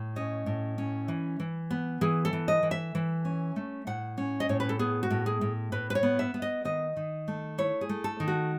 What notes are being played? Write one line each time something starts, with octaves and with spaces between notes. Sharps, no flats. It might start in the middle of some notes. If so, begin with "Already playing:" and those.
Already playing: A2
C#4 D#5
A2
C#4
E3
E3
B3
E3 G#4
A4
E3
D#5
E3
E5
E3
C#4
A3
A2 F#5
C#4
D#5
A2 C#5
B4
A4
B3 G#4
F#4
A2
G#4
A2
A2 B4
B4
C#5
B3
E5
B3
D#5
D#3 D#5
D#3
A3
E4 C#5
G#4
A3
A4
D#3
F#4